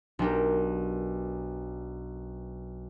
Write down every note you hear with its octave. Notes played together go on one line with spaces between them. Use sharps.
B1 D4 G4 A#4